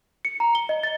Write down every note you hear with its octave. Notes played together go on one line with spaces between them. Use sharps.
C#7
A#5
G7
D#5
A6